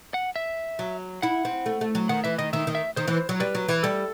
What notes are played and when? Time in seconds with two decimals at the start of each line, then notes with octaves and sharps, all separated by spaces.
0.14 F#5
0.36 E5
0.79 F#3
1.22 E4 F#5
1.45 C4
1.66 A3
1.81 A3
1.95 F#3
2.09 D#3 F#5
2.24 E3 E5
2.38 D#3 D#5
2.53 D#3 E5
2.67 D#3
2.75 E5
2.96 D#3 C5
3.08 E3
3.29 F#3
3.40 G3 B4
3.55 F#3
3.68 E3
3.83 G3 A4